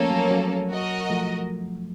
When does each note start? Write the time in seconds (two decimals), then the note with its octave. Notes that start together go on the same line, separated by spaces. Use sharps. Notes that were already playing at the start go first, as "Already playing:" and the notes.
Already playing: F3 A3 A#3 C#4 A4
0.11 F#3
0.31 F#3
0.70 F#4 A#4 D#5
1.10 F3 A3